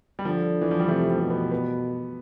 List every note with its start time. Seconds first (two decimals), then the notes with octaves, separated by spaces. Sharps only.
0.19 G3
0.25 D3 F3
0.61 E3
0.71 F3
0.80 G3
0.88 C3 A3
1.10 G3
1.20 B2
1.30 B3
1.52 B3